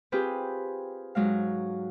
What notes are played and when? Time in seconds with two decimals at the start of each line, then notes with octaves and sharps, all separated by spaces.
0.12 C4 F4 G4 G#4 B4
1.15 G#2 F#3 G#3 F5